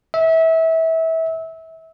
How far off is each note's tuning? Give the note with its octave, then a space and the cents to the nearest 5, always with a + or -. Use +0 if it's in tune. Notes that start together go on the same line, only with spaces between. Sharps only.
E5 -25